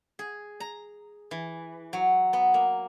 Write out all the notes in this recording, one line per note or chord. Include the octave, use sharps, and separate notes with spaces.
G#4
A#5
E3
F#3
B3
A#3